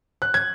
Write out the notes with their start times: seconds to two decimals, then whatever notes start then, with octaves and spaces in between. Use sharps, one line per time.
0.22 F#6
0.34 G#6